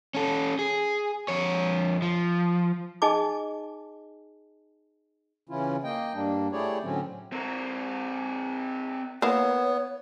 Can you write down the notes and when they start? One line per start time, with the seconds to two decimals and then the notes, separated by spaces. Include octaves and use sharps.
0.15 C#4 A4
0.59 G#4
1.28 F2 C#5
2.02 F3
3.02 D#4 G#4 D#5 G#5 A5 D6
5.49 C#3 E3 C#4 E4 F4
5.84 A#3 D#5 G5
6.14 G2 G3 A#3 D4
6.52 A3 E4 G4 G#4 C#5 D5
6.83 A2 D3 F#3 C4 C#4
7.32 C4 A#4
9.22 A#3 B3 E4 C#5